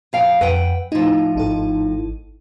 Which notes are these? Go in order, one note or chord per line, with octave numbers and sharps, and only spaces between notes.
F2 F5 G5
F2 B4 F#5 G5
A2 F3 D#4
G#1 D#4 A4